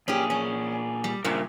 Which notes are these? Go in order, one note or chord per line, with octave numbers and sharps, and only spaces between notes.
A#2 C#4 G4 G#4
C#4
G3
G2 A#2 C#3 A#4 C5 E5